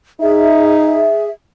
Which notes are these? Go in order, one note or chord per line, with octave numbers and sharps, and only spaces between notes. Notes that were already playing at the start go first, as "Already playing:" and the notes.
D#4 G#4 E5